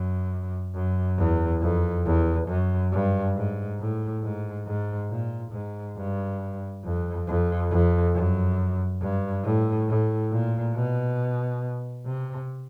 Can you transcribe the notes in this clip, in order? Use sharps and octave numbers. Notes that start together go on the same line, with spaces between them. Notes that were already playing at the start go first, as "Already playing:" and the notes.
Already playing: F#2
F#2
E2
F2
E2
F#2
G2
G#2
A2
G#2
G#2
A#2
G#2
G2
F2
F2
F2
F#2
G2
A2
A2
A#2
B2
C3